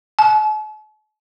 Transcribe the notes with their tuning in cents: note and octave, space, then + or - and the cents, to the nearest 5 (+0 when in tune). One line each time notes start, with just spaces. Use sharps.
A5 -45